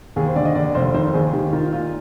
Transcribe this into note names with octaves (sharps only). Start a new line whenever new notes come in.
D#2 G#4
C5
D3 D5
D#5
D#2 D5
F1 C5
D#3 C5
D#2 G#4
D#3 G4
D#3 F4
A#2 F4